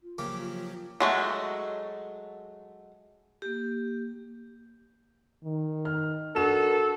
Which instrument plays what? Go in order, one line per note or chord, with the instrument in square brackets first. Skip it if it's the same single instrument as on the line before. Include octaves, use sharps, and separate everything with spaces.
[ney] F4
[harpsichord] C#3 A#3 G4 [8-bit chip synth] F3 F#3 [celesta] D6
[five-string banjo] F#3 G#3 A3
[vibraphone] A#3 G4
[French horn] D#3
[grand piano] F6
[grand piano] D4 F#4 E7 [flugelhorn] A4 [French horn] A#4